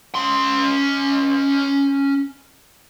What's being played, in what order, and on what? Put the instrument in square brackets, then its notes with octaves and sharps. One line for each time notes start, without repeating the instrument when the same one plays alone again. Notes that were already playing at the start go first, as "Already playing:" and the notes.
[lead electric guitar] C#4 C6